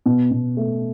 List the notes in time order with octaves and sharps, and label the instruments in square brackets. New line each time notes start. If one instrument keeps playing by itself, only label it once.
[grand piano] B2
B2
A3